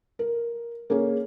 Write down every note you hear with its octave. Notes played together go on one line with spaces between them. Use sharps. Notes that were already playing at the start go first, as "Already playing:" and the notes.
A#4
A#3 C#4 G#4